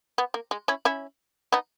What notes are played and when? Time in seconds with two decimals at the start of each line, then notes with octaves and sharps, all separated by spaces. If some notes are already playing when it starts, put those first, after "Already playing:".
0.18 B3
0.34 A#3
0.51 G#3
0.68 C#4 E4
0.85 C#4 E4
1.52 B3 D#4